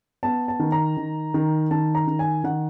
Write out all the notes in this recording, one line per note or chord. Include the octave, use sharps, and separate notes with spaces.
B3 A5
A5
D#3
A#5
D#3
D#3
D#3 A5
A#5
D#3
G#5
D#3 F#5